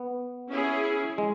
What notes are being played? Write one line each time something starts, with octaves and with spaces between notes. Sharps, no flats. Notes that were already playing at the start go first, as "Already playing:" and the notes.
Already playing: B3
C#4 E4 G#4
G#3